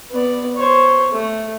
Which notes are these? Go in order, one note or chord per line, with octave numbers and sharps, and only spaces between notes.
B3 D5
C5 C#5
A3